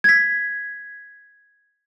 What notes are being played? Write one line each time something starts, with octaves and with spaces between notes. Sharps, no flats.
G#6 B6